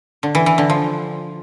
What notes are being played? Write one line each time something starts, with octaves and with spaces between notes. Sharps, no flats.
D3
E3
E3
D3
F3